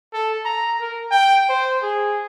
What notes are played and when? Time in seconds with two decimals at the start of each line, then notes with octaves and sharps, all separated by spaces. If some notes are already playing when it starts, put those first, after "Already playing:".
0.13 A4
0.45 A#5
0.80 A#4
1.11 G5
1.49 C5
1.82 G#4